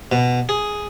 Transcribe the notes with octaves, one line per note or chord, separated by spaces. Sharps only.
B2
G#4